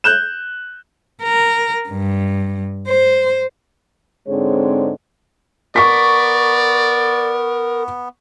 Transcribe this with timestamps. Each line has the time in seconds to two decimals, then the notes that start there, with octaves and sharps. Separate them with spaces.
0.04 F#6 G6 E7
1.23 A#4
1.90 G2
2.88 C5
4.27 G#2 D3 G#3 C4 C#5
5.76 B3 A#4 D5 C#6 B6